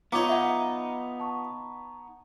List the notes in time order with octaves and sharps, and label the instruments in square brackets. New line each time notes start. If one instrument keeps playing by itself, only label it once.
[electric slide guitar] B3 D#4 [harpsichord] F4 C#5 [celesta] A#5 D6
[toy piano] E5 F#5
[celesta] A5 C#6